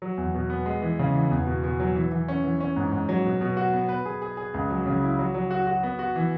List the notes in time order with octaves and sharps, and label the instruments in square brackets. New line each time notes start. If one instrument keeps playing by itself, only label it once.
[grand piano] F#3
E2
B2
B3
G#3
E3
C#3
E3
E2
B2
B2
F#3
E3
E3
C#4
E3
C#4
G#2
G#2
F#3
B2
B2
F#4
B3
B4
G#4
G#4
G#4
C#2
F#3
C#3
E4
F#3
F#3
F#4
F#4
B3
F#4
E3